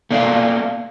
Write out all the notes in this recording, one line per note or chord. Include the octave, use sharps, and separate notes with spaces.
A3 A#3 D5 D#5 F5